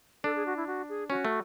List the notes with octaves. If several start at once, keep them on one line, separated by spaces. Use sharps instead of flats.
D4 A4
G#4
F#4
E4
F#4
G#4
C#4 F#4
A3